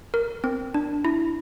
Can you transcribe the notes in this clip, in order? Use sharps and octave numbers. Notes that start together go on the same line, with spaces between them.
A#4
C4
D4
E4